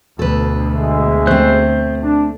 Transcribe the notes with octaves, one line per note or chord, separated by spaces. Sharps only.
D2 B2 A4 B4
G#3 G#4 E5
A3 C4 C5 F#6
D4